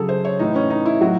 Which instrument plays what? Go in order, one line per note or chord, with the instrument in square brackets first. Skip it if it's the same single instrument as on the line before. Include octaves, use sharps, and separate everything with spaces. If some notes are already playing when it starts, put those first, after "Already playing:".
Already playing: [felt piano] C#3 F#3 G#4 A4
C5
C#5
A2 E3 D#4
C#4
D#4
E4
A2 F#3 F#4